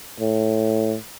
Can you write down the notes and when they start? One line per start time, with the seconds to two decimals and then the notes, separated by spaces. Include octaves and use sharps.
0.20 A2